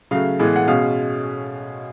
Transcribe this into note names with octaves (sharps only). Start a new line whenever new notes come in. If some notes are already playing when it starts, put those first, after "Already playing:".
C#3 F#3 A3 F5
A2 E3 G#3 B3
F#5
B2 G#3 C#4 F5